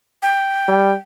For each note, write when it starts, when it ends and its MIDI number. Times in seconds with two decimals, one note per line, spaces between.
0.22 0.95 79
0.68 0.94 55